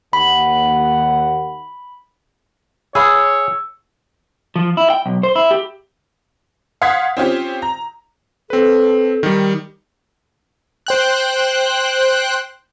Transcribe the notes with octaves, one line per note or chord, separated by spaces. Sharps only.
D#2 F#5 B5
G#4 C#5 F5 B5 D#6 E6
F3
E4
G5
B1
C5
E4
G4
F5 F#5 C6 D#6 G#6 B6
C4 C#4 F4 G4
A#5
C4 A4 B4
D#3 G3
C5 G5 F#6